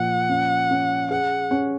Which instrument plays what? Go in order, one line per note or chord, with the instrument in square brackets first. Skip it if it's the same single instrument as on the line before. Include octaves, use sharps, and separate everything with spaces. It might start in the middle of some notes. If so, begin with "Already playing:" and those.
Already playing: [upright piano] A#2 F3 [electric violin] F#5
[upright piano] C#4
C#4
[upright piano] G#4 [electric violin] F#5
[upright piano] C#4